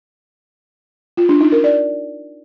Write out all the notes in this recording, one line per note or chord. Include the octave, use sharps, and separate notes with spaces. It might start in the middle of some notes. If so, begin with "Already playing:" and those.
F4
D4
D#4
A#4
D5